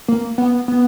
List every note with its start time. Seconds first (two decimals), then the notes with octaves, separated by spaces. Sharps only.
0.08 A#3
0.38 B3
0.68 B3